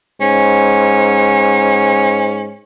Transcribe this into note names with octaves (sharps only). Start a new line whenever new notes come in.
G#2 C#4